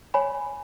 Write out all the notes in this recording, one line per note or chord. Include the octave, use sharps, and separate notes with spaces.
C#5 G#5 B5